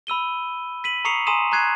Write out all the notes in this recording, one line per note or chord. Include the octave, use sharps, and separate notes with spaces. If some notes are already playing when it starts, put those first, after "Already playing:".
B5 E6 D#7 G7
B6 D#7 F#7
A#5 C#6 D#6 C7 C#7 F7
G#5 A#5 C6 D#6 D#7 E7
A#5 C#6 F#6 G#6 C7 D#7